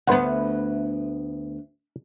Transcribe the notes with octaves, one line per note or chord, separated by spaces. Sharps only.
D2 B3 B4 C5 F#5